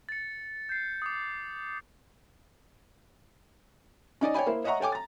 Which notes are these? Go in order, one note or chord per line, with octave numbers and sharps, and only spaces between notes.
A6 C#7
G6 C7
D6 D#6
C#4 D#4 D5 D#5
C#5 D5 G5 G#5 B5
A#3 E4 C5
C#5 D#5 E5 F#5 A#5 C#6
A4 C#5 G5 G#5 D6
A#5 A6